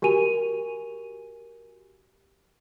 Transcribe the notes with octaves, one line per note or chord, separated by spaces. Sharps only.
F#4 G4 A#4 G#5 D#7 F7